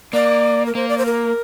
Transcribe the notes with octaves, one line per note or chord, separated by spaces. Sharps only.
A#3 D5
A#4
A#3 C5
D5
C5
A#4